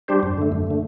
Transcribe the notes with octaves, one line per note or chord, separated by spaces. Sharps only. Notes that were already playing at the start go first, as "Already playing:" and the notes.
G3 D4 G4 C5
F#2
D3 A3
F#2
D3 A3